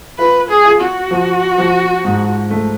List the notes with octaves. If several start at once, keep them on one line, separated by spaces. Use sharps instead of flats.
F4 B4
G#4
F4
F#4
F3
F3
G#2
A3